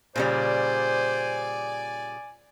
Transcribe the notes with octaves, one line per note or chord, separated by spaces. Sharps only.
A#2 C#3 G3 C5 D5 G#5